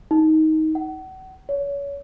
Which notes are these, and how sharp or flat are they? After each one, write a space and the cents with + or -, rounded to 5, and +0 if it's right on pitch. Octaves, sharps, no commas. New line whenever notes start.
D#4 +15
F#5 +35
C#5 +30